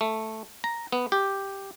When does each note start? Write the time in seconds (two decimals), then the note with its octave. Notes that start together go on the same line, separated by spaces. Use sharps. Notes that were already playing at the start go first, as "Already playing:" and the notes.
0.01 A3
0.64 A#5
0.92 B3
1.12 G4